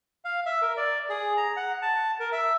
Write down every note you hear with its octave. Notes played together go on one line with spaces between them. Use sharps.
F5
E5
A#4
D5
G#4
A#5
F#5
A5
A#4
E5